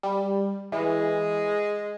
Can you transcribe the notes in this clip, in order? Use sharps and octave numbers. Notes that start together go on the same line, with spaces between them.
G3
E3 G#3